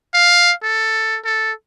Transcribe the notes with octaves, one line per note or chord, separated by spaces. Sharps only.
F5
A4
A4